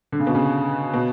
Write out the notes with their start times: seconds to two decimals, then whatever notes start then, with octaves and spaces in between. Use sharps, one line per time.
0.12 D3
0.20 C#3
0.27 B2
0.35 C#3
0.94 B2